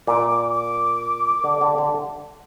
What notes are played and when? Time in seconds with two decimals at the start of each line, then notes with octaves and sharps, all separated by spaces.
0.07 A#2 D6
0.30 D6
0.53 D6
1.44 D3
1.61 D3
1.78 D3